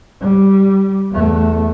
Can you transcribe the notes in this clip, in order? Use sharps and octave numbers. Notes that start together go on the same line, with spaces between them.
G3
E2 A3